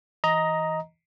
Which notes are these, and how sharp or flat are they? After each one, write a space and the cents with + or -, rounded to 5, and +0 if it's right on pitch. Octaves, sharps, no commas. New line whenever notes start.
E3 +0 D#5 +10 A#5 +0